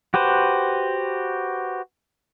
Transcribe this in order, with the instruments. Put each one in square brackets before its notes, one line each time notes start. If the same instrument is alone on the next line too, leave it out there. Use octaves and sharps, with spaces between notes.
[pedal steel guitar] F#4 G4 B4 C5